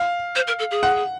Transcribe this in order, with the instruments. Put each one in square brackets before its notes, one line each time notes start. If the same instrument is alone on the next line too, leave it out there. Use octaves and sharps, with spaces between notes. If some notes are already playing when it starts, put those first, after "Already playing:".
Already playing: [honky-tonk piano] F5
[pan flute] C5
A#4
A4
G#4
[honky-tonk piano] F#5